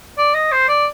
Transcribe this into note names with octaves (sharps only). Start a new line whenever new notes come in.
D5
D#5
C5
D5